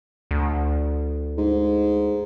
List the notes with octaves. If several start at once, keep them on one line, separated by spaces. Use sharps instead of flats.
D2
G#2